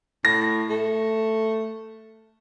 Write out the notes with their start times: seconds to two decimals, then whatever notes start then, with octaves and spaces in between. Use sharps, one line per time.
0.25 A2 A#6
0.70 A3